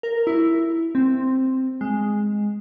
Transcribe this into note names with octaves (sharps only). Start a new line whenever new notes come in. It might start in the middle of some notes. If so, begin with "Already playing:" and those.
A#4
E4
C4
G#3